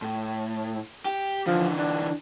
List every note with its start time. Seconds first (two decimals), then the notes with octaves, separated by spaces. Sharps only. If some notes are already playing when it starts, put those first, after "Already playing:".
0.02 A2
1.05 G4
1.47 D3 E3 F3
1.78 D4